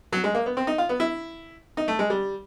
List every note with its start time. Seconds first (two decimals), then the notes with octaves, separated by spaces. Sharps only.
0.13 F#3
0.24 G#3
0.35 A#3
0.46 B3
0.57 C4
0.67 D#4
0.78 F4
0.89 B3
1.00 E4
1.77 D#4
1.88 A3
1.99 G#3
2.10 G3